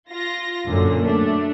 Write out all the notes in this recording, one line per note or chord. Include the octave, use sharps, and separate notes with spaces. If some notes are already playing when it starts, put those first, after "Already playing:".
F4 A#6
F#2 A#2 D3
A3 D4